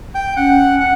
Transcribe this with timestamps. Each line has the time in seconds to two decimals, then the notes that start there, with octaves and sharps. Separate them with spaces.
0.15 G5
0.37 C#4 F#5
0.80 F#5